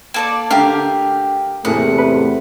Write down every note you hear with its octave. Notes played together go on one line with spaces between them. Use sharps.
A#3 A4 D5
D3 A3 G4 A#4 F5
E2 A2 C3 A3 A#3 G#4 F#5
B4